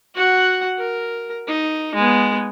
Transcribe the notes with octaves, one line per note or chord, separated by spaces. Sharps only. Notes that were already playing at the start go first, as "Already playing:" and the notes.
F#4 F#5
A#4
D#4
G#3 B3